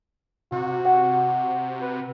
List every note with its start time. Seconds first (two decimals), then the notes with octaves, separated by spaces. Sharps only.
0.52 C3 F#4
0.85 F#5
1.27 F#4
1.81 B4